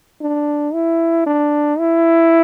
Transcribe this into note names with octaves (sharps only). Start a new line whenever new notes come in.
D4
E4
D4
E4